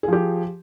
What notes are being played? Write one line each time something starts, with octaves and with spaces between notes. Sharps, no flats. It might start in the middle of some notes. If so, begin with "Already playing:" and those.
F3 G4 G#4